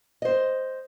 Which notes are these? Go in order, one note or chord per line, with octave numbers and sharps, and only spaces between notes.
C5 D#5